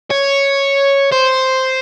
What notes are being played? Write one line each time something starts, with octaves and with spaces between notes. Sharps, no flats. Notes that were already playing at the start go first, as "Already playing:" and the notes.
C#5
C5